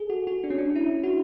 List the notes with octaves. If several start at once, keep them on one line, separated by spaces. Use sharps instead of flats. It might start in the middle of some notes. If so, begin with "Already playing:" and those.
Already playing: G#4 A4
F#4
F#4
D4
C#4
D4
E4
F#4